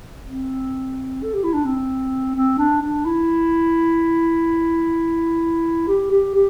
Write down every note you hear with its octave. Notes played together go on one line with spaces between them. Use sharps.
C4
A4
G4
E4
D4
C4
C4
D4
D4
E4
G4
G4
G4